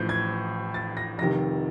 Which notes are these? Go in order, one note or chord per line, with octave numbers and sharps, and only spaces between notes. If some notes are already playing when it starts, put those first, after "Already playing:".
Already playing: A1 A2 F3 G6
G#6
A6
A#6
F1 F2 C3 D#3 A#6